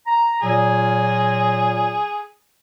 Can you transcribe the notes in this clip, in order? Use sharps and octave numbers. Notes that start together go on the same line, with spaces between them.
A#5
A#2 F#3 G#4